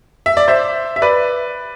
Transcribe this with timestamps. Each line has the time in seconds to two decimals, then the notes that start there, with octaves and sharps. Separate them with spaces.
0.26 E5
0.37 D5
0.48 C5 E5
0.96 E5
1.02 B4 D5